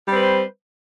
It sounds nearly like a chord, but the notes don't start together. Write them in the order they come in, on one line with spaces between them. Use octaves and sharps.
G3 C4 B4 C5